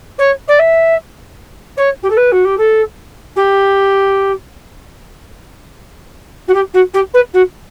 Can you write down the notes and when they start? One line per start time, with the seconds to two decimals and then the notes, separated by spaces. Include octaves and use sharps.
0.18 C#5
0.47 D5
0.59 E5
1.77 C#5
2.03 G4
2.10 A4
2.16 B4
2.31 F#4
2.44 G4
2.57 A4
3.36 G4
6.48 F#4
6.54 G4
6.73 F#4
6.93 G4
7.14 B4
7.33 F#4